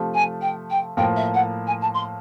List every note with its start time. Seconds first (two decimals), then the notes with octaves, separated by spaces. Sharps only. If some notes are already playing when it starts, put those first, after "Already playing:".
Already playing: C3 F3 A3
0.14 G#5
0.41 G5
0.70 G5
0.97 A2 F3 A#3 G5
1.16 E5
1.34 F#5
1.67 G#5
1.81 A5
1.94 C6